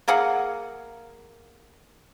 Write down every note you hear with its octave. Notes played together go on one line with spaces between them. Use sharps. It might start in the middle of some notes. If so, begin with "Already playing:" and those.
A#3 G#4 F5 F#5